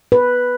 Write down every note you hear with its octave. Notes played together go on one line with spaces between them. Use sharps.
B4